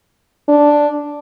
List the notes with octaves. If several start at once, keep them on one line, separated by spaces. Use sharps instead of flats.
D4